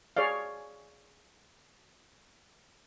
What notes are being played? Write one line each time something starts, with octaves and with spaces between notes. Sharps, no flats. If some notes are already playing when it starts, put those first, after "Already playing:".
G#4 C#5 D5 F5